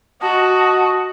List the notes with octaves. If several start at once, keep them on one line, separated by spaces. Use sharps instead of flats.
F#4 D#5 A5